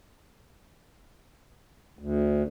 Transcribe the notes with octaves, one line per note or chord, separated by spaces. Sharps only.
D2